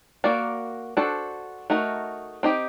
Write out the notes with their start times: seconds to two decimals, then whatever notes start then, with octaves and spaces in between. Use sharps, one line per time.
0.24 A#3 F#4 A#4 D5
0.97 D4 F#4 A4 C5
1.70 A3 D#4 F#4 A#4
2.43 C4 D#4 G4